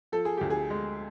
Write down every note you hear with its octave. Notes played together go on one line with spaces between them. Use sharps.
F3 A4
G#4
D2 G4
G#4
G#3